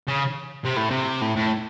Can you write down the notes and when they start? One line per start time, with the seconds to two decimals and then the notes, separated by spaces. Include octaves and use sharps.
0.08 C#3
0.65 C3
0.77 A2
0.91 C3
1.22 A2
1.36 A2